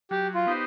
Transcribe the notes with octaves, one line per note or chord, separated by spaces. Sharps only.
F#3 G4
F4
B3 D#4 G4 C5